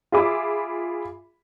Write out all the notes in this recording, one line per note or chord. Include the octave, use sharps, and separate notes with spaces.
F4 G#4 E5 B5 D6